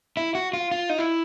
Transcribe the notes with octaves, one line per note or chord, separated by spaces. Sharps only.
E4
F#4
F4
F4
D#4
E4